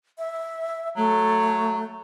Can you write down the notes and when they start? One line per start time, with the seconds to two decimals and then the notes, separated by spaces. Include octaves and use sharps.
0.18 E5
0.97 F#3 A3